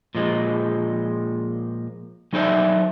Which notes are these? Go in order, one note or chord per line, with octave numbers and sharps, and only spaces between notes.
A#2 F3 G#3
F#3 D#4 A4 C5 D5 E5